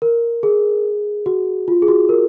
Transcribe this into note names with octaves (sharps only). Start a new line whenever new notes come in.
A#4
G#4
F#4
F4
G#4
F#4
A#4